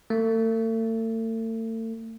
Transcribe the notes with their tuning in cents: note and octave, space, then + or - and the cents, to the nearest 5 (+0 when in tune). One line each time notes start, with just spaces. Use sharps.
A3 +40